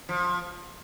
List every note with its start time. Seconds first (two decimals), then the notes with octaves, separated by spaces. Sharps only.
0.09 F3